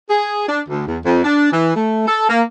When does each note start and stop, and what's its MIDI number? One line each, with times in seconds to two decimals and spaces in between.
0.09 0.44 68
0.47 0.60 62
0.67 0.85 38
0.86 0.98 40
1.04 1.20 41
1.24 1.48 62
1.52 1.74 52
1.75 2.04 57
2.07 2.26 69
2.28 2.41 58